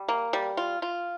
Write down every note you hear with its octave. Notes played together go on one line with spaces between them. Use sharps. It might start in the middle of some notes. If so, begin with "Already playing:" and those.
Already playing: G3
A#3
G3
F4
F4